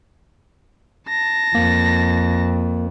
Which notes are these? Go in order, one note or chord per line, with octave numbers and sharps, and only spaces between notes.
A5 A#6
F2 A#3